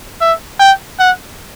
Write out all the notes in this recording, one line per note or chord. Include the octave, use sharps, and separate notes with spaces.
E5
G5
F#5